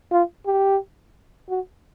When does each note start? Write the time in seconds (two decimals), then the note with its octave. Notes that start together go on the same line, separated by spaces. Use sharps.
0.12 F4
0.46 G4
1.49 F#4